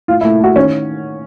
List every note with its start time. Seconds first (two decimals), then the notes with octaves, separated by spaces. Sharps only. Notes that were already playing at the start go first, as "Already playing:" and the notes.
0.08 A2 F4
0.21 E4
0.25 A3
0.40 A3 F#4
0.56 D#3 C#4